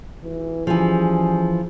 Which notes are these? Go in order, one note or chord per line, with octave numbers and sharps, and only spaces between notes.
G#1 E3
E3 F3 G3 C#4 G#4